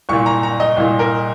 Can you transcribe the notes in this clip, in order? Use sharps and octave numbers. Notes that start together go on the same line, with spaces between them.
C2 A#2 C#6
A#5
A#5
D#5
C2 A#2
A#4